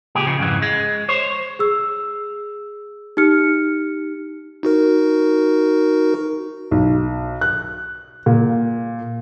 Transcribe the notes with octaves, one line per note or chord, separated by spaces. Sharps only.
C#2 A#2 G4 G#4
C#3 F3
F2 G#2 C#3 E3
G#3
C5 C#5
G#4 E6
D#4 G4 F6 C#7
D#4 F#4 A#4
B1
F#6
A#2